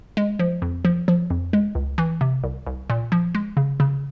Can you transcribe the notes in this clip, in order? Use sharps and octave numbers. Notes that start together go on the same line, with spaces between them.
G#3
F3
F2
F3
F3
F2
G#3
C#2
E3
C3
C2
C2
A#2
F3
G#3
C#3
C#3